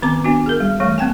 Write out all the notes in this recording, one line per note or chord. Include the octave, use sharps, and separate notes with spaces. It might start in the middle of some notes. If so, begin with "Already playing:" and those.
D#3 B3 C4 A#5 D6
B3 D4 F#4
G#4 A#4
G3
E3 G3 A3
A#3 C4 G5 G#5